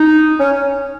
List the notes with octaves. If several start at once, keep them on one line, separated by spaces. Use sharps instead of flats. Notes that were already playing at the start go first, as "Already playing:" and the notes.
Already playing: D#4
C#4